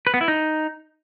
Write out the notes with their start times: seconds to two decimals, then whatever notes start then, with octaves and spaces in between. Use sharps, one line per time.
0.07 B4
0.14 B3
0.21 E4
0.28 D#4